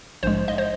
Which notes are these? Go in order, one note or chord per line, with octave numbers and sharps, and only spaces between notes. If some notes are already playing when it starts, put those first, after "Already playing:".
A#1 G#2 G#3 C5
D#5
C5